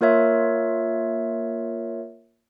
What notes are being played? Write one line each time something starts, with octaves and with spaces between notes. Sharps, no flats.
A#3 F4 A#4 C#5 E5